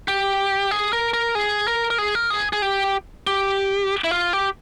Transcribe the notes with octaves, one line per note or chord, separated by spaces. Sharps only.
G4
G#4
A#4
A#4
G#4
A#4
A#4
G#4
A#4
G#4
G#4
G4
G4
E4
F4
G4